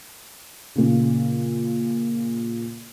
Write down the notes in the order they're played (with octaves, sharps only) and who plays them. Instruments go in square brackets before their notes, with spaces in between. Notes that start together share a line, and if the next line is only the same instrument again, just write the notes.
[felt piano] A#2 C#3